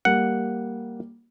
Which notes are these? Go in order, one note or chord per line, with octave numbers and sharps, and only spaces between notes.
G3 A#3 F#5